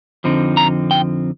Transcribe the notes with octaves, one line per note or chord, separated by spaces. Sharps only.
F2 D3 F3 C4 D#4
A#5
G5